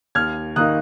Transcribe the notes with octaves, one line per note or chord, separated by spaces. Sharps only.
D#2 F6 G#6
D#3 A#3 D#4 D#6 F#6